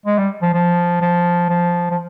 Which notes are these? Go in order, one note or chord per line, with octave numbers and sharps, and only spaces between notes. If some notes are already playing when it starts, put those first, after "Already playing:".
G#3
G3
F3
F3
F3
F3
F3